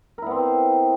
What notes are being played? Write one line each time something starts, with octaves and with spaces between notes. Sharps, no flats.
B3 C4 E4 A#4